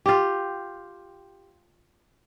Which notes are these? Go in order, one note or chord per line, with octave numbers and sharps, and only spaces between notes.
F4 G4